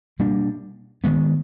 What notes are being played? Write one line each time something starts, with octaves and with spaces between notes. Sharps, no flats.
B2 G3 A#3 D4
D#3 G#3 B3